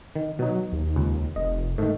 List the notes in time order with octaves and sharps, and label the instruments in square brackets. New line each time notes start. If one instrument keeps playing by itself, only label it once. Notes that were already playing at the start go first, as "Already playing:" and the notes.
[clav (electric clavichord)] D#3
[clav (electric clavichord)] B2 D#4 [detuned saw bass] F#3
[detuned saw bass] D#2
[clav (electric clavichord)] C#2
[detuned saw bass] F1 [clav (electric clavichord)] D#5
[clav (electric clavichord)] G#2 D#3 [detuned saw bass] A3